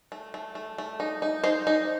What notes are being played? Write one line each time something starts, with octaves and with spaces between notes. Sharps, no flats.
A3
A3
A3
A3
D#4
D#4
D#4 C5
D#4